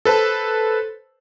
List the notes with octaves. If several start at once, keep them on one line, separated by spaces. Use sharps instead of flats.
A4 B4 C5 A5